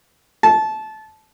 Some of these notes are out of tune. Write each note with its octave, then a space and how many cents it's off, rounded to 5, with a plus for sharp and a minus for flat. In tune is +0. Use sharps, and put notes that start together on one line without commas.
A5 -20